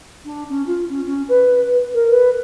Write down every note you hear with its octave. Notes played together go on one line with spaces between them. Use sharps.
D4
C#4
F4
C#4
C#4
B4
A#4
B4